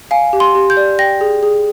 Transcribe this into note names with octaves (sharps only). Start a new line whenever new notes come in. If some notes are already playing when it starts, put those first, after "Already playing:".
F5 G#5
G4
C6
G4
G6
D5
G5 A#6
G#4
G#4